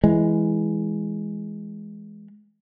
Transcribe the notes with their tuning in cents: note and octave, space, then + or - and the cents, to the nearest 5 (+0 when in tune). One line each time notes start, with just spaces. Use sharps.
E3 +0 G#3 +5